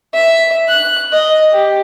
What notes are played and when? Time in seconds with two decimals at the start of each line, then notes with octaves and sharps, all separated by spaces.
0.14 E5
0.69 F#6
1.13 D#5
1.52 G4